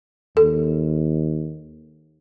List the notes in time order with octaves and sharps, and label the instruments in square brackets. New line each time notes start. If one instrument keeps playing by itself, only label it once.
[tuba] D#2 [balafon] A4